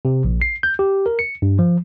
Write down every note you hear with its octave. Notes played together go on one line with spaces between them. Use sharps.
C3
A#1
C7
G6
G4
A#4
C#7
G2
F3